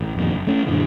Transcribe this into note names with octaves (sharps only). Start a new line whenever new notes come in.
A1
F2 A#2 D#3
F#1
A3 C#4
F#2 A#2 D3 E3